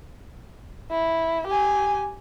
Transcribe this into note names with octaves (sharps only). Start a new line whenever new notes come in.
E4
G4 G#5